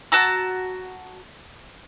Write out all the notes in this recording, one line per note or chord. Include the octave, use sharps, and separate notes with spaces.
F#4 A5 A#5 E6